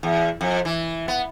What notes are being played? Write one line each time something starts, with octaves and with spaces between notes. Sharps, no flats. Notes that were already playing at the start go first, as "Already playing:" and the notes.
E2
F2
E3
B3